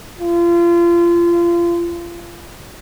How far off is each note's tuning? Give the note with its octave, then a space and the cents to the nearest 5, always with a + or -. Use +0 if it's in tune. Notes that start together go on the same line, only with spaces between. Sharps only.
F4 -30